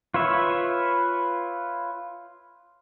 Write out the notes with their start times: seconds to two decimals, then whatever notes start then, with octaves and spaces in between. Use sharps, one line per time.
0.14 F4 B4 C#5 E5